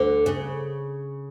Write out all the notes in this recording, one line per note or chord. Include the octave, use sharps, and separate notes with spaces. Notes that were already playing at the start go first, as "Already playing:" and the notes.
Already playing: D2 D3
C#3